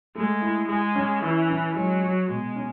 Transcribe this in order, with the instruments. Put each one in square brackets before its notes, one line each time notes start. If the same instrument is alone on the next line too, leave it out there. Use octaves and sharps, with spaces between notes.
[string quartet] G#3 [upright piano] A3
[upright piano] E4
[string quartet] G#3 [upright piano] G#4
[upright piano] C#4
[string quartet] E3 [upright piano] E4
[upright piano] C#4
[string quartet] F#3 [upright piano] G#3
[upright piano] F#4
[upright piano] B2 [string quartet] G#3
[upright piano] C#4